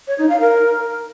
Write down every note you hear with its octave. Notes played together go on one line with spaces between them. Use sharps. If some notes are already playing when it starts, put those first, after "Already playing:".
C#5
D#4
F5
A#4